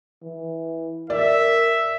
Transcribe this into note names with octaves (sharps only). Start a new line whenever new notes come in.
E3
A#4 D5 E5